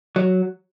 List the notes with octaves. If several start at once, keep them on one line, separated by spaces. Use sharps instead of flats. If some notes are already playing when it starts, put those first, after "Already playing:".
F#3